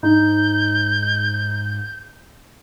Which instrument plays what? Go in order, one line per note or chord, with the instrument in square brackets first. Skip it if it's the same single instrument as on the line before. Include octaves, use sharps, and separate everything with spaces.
[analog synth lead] G#2 [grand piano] D#4 [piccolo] G6